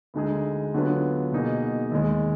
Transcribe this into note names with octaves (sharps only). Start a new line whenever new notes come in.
D2 D3 G#3 D#4 G#4
D2 D3 F#3 B3 F4
B2 A#3 D#4 G#4
D#2 D#3 G#3